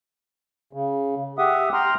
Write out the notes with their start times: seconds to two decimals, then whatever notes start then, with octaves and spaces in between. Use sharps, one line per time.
0.73 C#3
1.38 G4 E5 F#5 D#6
1.73 G5 A#5 C6 F6